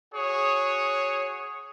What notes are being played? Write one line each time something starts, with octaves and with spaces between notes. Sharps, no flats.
F#4 G#4 C#5